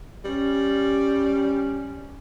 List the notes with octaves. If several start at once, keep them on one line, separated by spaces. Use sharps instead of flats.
G3 C#4